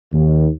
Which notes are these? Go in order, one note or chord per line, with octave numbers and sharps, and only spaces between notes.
D#2